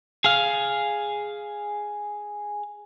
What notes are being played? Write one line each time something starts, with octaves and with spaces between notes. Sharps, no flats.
G#4 F5